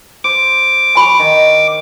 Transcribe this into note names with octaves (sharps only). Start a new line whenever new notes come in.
C5 D6
G#5 B5 C#6
D#3